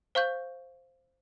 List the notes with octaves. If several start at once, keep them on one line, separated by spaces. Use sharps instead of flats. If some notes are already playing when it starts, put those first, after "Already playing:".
C5 F5 C#6 G6